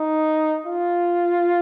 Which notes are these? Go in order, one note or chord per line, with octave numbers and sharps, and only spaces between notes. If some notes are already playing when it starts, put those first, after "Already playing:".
Already playing: D#4
F4